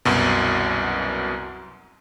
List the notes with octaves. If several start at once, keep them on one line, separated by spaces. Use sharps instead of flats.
C2 F#2 B2